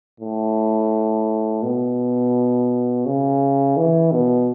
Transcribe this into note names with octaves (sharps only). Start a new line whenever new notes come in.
A2
B2
C#3
E3
B2